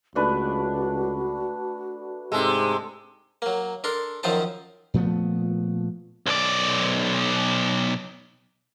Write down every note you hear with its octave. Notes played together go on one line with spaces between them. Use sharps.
C#2 A3 D4 F#4 B4
G#2 C3 G#3 A4
F#3 A#3
D4 A4 A#4 C6
F#2 D#3 F3 C4 C5 A5
A#2 F3 A3 B3
B1 D5